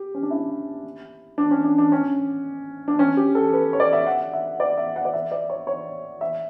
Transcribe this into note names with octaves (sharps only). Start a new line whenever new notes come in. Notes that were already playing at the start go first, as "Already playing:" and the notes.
Already playing: G4
C#4
D4
E4
D4
C#4
D4
D4
C#4
D4
C#4
G4
A4
B4
C#5
D5
E5
F#5
E5
D5
E5
F#5
D5
E5
D5
C#5
C#5
E5